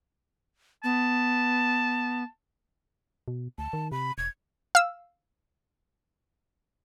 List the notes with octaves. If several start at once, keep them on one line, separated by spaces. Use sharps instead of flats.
B3 A5
B2
D2 A5
D#3
C3 B5
E1 G#6
F5 E6